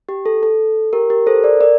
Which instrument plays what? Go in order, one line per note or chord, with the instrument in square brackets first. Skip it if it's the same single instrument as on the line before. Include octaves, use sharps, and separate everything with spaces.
[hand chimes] G4
A4
A4
G4 A#4
G4 A#4
A4 C5
A#4 D5
A#4 D5